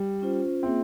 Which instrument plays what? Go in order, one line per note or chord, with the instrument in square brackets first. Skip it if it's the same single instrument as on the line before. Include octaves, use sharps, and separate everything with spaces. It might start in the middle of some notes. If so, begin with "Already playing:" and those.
Already playing: [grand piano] G3
[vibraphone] C#4 F4 C5
[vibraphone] A#3 F4 G#4 E5 [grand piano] C4